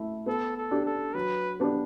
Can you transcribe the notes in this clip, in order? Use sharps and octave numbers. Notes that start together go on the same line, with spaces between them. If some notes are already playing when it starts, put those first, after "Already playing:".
Already playing: A3 E4
B3 A4
A4
D4 G4 D5
A4
F#3 B4
B3 D4 G4 D5